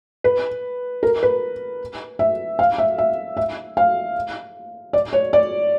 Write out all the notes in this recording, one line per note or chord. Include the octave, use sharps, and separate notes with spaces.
B4
A#4
B4
E5
F5
E5
E5
E5
F5
D5
C#5
D5